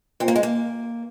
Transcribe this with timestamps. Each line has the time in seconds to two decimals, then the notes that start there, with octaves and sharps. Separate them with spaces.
0.20 A#2 C4
0.28 A#3
0.36 G#3
0.43 A#3